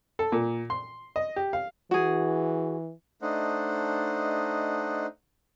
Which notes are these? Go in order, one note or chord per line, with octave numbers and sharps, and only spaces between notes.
A4
A#2
C6
D#5
G4
F5
E3 F#4 G#4
A3 D4 D#4 C5 D#5 F#5